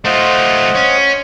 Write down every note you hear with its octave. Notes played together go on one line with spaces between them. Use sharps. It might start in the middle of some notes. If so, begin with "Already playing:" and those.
A3 F4 C5 D#5 F#5
C#4